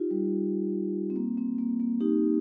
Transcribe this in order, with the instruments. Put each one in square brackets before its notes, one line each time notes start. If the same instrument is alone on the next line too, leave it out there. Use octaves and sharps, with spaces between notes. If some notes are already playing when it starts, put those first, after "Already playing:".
Already playing: [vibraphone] D#4 F4 G4
G3
C4
A#3
C4
A#3
A#3
D#4 G4